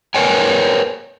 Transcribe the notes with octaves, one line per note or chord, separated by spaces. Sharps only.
A#4 B4 C#5 G5 G#5